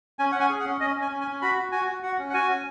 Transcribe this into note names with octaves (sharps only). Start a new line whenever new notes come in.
C#4 G#5
F#5
C#4 G#5
G#4
F#5
C#4
C#4 D#5
C#4
G#5
C#4
G#5
C#4
F#4 B5
F#4
F#4 G#5
F#4
F#4 F#5
C#4
F#5
F#4 G#5
C#4